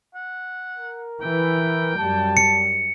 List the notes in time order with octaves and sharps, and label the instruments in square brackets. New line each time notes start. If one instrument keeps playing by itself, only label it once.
[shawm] F#5
[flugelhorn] A#4
[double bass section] E3 [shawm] G5
[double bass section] F#2 G3 [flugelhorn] A5
[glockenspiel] C#7